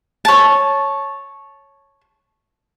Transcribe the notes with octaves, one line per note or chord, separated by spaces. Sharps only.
C#5 A5